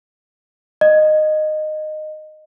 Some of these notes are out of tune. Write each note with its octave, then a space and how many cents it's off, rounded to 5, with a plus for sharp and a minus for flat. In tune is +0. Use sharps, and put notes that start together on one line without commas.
D#5 -15